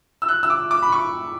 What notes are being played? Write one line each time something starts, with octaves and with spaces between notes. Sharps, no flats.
E6
F#6
E6
D6
D6
B5
C#6